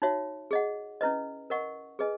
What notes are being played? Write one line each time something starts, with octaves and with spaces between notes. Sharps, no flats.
D#4 F#4 C#5 E5
G#4 D#5 F#5
C#4 E4 B4 D#5
A#4 D#5 F#5 C#6
G#4 B4 D#5 G#5